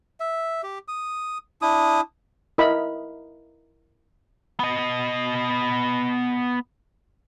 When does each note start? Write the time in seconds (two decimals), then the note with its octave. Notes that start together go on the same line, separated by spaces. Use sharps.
0.20 E5
0.63 G4
0.88 D#6
1.62 D4 E4 D#6
2.58 E4 A#4 D#5 B5
4.60 B3 D#5